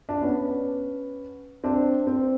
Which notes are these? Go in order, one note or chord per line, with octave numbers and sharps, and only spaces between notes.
D4
B3 C#4
C4 D4
C4